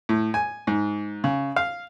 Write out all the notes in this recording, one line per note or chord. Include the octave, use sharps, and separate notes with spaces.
A2
G#5
G#2
C#3
F5